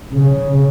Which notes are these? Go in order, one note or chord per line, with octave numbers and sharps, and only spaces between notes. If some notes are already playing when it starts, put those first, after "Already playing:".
C#3